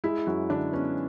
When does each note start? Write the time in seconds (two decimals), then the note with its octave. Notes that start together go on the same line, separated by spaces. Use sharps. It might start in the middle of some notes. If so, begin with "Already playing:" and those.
0.04 G#3 E4
0.27 F#2 F#4
0.50 D3 D4
0.73 B3 C#4